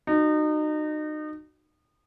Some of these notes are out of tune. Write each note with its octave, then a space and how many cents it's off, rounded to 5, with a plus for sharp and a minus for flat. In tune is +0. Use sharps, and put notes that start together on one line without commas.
D#4 -30 F#4 +0